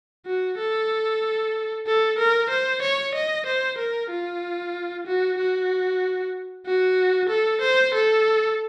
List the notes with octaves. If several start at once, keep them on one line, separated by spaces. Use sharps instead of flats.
F#4
A4
A4
A#4
C5
C#5
D#5
C5
A#4
F4
F#4
F#4
F#4
A4
C5
A4